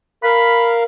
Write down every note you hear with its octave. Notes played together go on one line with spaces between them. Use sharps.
A#4 F5 B5